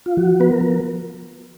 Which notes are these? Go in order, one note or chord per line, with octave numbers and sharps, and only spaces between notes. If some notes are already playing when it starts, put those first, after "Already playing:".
F4
F3 F#4
B3 B4
A#4
F3